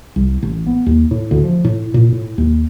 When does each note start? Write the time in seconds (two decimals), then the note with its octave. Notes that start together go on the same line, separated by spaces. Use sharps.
0.16 C2
0.42 A1
0.67 B3
0.86 D#2
1.11 A2
1.31 D2
1.44 F3
1.64 A2
1.94 A#2
2.12 A2
2.38 D#2